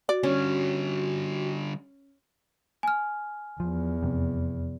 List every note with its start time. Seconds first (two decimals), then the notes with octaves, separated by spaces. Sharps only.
0.09 F#4 D5
0.23 D3 G3 C#4
2.83 G#5 F6
3.60 E2 F3
4.03 F2 C3